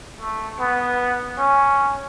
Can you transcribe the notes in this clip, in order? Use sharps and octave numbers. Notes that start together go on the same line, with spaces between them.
A3
B3
C#4